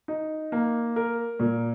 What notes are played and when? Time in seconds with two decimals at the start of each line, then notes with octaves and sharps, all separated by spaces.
0.08 D#4
0.52 A#3
0.96 A#4
1.39 A#2